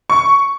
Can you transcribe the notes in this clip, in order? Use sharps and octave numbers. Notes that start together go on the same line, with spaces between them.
C#6